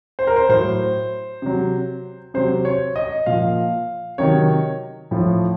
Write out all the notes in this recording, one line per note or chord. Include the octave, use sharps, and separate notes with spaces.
C5
A#4
C5
A2 F#3 C5
C3 F#3
C3 F#3 C5
C#5
D#5
A#2 F3 F5
C3 D#3 F#3 C#5
A2 F3